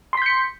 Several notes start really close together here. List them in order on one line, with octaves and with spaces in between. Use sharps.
C6 B6 G6 C#7